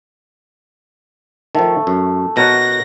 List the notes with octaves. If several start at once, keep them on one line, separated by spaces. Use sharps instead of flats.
D#3 F3 A3
F#2
B2 A#4 C#5 F#5 A#6